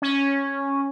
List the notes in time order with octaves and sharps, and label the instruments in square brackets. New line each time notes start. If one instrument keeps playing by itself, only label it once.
[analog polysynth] C#4